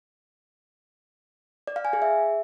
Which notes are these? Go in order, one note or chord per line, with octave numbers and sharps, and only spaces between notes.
D5
F5
G#5
G#4
E5